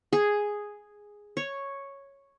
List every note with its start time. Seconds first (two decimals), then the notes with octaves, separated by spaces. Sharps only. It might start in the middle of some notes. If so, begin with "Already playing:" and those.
0.13 G#4
1.37 C#5